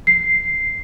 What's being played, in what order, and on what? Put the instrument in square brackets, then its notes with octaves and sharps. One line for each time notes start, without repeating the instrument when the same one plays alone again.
[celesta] C7